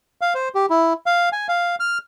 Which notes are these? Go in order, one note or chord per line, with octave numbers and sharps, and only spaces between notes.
F5
C5
G4
E4
F5
G#5
F5
F6